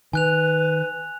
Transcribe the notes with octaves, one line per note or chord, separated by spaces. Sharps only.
D#3 B4 G#5 F#6 F7